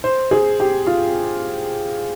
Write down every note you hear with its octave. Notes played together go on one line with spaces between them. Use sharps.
C5
G#4
G4
F4